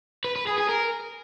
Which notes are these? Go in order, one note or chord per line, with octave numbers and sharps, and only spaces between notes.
B4
B4
G#4
G#4
A#4